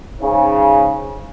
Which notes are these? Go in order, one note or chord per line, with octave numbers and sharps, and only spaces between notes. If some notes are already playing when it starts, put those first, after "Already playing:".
G#2 C#3